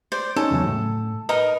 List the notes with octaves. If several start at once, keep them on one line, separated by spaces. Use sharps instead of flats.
C5 D5
C#4 D#4 A4 C#5
E2 C#3 F#3
A2
D#4 A#4 B4 D#5